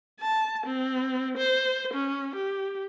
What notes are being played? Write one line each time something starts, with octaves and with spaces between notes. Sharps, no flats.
A5
C4
C5
C#4
G4